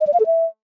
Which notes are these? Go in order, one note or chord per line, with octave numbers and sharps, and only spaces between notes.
D#5
D5
F5
A4
E5